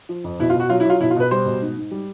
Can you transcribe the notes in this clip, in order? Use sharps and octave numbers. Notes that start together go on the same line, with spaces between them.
F3
F2
B2 E4
F4
B2
F#4
F#3 F4
E4
F#3 F4
B2 E4
F4
B2 B4
G3 C5
B2
G#2
G#2
G3